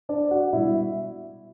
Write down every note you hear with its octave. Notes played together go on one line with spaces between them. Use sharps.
D4 D5
F#4 F#5
B2 G3 E4 E5